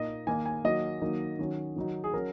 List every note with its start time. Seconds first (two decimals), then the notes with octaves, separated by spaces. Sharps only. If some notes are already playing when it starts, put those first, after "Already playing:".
Already playing: A#2 A#3 D#4 D#5
0.27 D#3 A#3 D#4 G#5
0.46 G#5
0.64 D#3 F#3 A#3 D#5
1.02 D#3 F#3 A#3 D#4
1.39 D#3 F#3 C#4
1.76 D#3 F#3 D#4
2.04 G#4
2.14 F#3 C#4 A#4